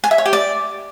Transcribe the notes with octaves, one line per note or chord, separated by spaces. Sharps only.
G#5
E5
C#5
G4
D5